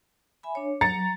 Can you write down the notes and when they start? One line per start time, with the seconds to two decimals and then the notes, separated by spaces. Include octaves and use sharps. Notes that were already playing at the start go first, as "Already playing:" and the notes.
0.43 E5 G#5 B5
0.55 D4 C#5
0.81 F#3 A#5 A6 C#7